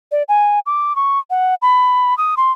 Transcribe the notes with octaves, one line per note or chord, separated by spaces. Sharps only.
D5
G#5
D6
C#6
F#5
B5
D#6
C6